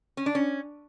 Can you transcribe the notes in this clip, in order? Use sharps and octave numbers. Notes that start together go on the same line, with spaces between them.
C#4
D4
C#4